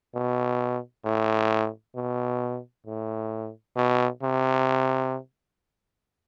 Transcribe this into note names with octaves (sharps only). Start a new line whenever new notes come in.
B2
A2
B2
A2
B2
C3